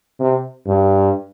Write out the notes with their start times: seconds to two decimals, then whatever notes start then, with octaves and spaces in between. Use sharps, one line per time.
0.20 C3
0.67 G2